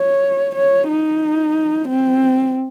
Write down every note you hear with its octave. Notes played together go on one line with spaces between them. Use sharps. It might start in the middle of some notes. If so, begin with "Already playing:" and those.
Already playing: C#5
C#5
D#4
C4